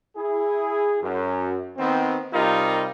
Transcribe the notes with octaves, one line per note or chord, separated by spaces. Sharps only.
E4 G#4
F#2
D#3 B3 C4
C3 G3 D#4 F4 A#4